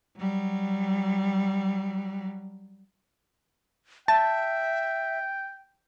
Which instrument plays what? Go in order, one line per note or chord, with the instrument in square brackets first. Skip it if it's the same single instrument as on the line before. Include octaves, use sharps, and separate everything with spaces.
[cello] F#3 G3
[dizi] E5 [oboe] G5 [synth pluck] A5